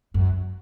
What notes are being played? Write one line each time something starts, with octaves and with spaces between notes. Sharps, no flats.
F#2